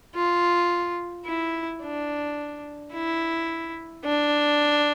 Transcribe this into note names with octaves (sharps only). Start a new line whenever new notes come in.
F4
E4
D4
E4
D4